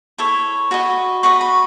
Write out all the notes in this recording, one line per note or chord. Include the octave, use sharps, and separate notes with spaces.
E4 A4 C#5
F#4 B4 D#5
F#4 B4 D#5 C#6
B5